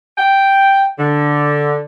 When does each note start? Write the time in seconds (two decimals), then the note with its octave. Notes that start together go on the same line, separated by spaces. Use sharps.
0.18 G5
0.99 D3